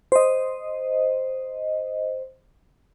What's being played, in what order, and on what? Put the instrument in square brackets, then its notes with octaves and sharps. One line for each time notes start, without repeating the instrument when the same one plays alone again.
[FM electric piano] C5 D#5